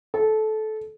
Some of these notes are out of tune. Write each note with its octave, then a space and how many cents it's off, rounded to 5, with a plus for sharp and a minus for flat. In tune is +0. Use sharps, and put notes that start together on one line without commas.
A4 -20